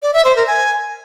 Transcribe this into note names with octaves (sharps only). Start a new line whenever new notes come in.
D5
E5
C5
A#4
G#5